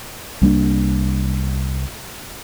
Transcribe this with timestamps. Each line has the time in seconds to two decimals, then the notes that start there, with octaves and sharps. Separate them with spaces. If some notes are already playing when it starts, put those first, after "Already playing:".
0.42 C2 G3 A#3 D4